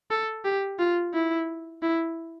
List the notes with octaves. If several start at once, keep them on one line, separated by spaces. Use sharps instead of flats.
A4
G4
F4
E4
E4